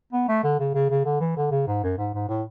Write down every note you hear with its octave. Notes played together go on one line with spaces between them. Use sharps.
B3
A3
D3
C#3
C#3
C#3
D3
E3
D3
C#3
G#2
F#2
G#2
G#2
A2